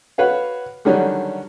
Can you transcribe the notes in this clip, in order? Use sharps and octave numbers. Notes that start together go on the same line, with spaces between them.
F#4 B4 C#5 F5
D3 D#3 F#3 G3 C#4 D4